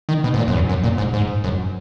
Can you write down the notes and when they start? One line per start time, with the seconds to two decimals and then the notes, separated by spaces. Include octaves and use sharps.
0.09 D#3
0.24 B2
0.34 G#2
0.38 A#2
0.48 F#2
0.54 E2
0.69 F#2
0.84 A#2
0.98 G#2
1.13 G#2
1.44 F#2